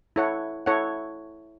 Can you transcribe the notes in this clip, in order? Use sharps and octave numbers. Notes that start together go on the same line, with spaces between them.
E4 A4 C#5 F#5
E4 A4 C#5 F#5